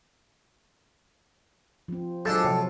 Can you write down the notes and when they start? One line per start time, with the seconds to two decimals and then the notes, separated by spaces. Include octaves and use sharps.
1.88 F3 C4
2.25 F3 F#3 G#3 D4 F4 A4
2.44 A2 C3 F3